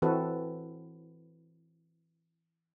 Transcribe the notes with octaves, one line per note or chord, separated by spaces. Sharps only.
E3 C4 F#4 A4 B4